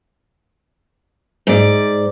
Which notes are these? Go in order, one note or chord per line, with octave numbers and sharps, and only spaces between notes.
G#2 D5